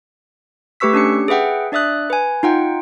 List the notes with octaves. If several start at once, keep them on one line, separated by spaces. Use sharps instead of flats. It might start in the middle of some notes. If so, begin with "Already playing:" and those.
A3 G4 B4 C#6 E6 B6
C#4 D4 G4 C#7
G#4 B4 E5 F#5 G5
D4 D5 E5 D#6 F#6
B4 G#5
D#4 F4 F#5 G5